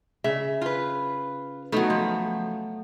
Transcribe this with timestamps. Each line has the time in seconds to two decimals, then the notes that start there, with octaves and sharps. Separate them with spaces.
0.24 C#3 E5
0.61 F4 B4
1.72 F#3 A3 B3 D#4
1.90 F3